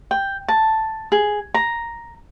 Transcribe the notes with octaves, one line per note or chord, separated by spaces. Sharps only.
G5
A5
G#4
A#5